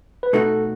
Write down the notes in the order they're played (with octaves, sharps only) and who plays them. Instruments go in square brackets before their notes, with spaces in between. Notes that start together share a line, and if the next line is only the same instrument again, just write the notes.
[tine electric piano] B4
[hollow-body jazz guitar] B2 A3 D#4 F#4 [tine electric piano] A4